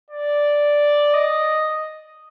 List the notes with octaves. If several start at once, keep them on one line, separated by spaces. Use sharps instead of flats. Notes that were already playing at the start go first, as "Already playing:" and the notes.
D5
D#5